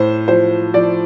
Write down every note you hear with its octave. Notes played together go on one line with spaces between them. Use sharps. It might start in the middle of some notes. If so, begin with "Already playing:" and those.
Already playing: A2 C5
F3 C5
F3 D5